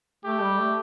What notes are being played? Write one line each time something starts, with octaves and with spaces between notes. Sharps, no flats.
A3 G4
G3
A3